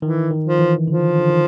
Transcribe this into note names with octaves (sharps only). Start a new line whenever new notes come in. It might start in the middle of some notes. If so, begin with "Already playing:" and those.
D#3 E3
D#3
F3
E3
D3 F3
D3
D#3